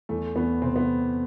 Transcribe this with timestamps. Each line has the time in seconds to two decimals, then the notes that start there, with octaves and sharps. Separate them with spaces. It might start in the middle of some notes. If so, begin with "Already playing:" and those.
0.09 E2 A3
0.36 E2 B3
0.62 C3 C4
0.76 B3